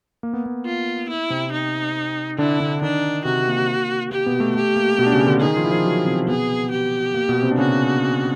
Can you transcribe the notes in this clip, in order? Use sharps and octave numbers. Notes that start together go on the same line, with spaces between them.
A#3
B3
A#3
F4
E4
C3 C4
D#4
D3 D4 E4
D3 D4
D#3 D4 D#4
C3 C4 F#4
A#3
A#3 G4
B2 B3
A3
A3 G4
A#3
B2 B3
D4
C#3 C#4
D3 D4
D#3 D#4 G#4
F3 F4
E4
F3 F4
F#3 F#4
C3 C4
B2 B3 G#4
G4
A#3
B2 B3
C3 C4
D4
C#3 C#4 F#4